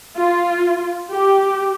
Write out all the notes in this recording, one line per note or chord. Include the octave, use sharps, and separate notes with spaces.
F4
G4